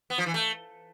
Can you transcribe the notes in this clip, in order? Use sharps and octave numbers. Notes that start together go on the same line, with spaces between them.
B3
F3
E3
A3